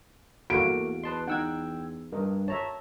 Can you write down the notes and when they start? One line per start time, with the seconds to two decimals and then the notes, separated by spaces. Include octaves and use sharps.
0.50 E2 A3 A#3 F#4 F5 D7
1.04 B4 D#5 A5 C6
1.28 D#4 F#5 G5 E6 G#6
2.12 G2 A#4 D#5
2.48 C#5 E5 A5 A#5